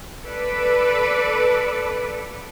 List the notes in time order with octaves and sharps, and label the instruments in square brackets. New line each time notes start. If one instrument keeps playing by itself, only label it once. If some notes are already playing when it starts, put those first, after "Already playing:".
[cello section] A4 B4 D5